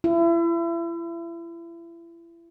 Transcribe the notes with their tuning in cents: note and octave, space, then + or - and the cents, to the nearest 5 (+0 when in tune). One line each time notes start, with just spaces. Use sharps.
E4 +35